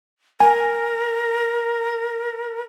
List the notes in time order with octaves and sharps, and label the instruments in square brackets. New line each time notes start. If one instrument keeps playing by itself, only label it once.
[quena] A#4 [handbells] G#5